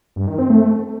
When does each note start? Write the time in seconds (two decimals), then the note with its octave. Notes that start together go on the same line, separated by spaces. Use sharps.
0.16 G2
0.27 D#3
0.39 C4
0.50 A3